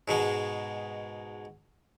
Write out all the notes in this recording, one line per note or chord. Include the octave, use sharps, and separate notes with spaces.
G#2 B2 G#3